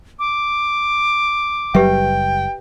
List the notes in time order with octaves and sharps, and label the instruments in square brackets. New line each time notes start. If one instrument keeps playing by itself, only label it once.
[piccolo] D6
[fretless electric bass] F#1 F#3 G3 [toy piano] G4 B4 E5 [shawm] G5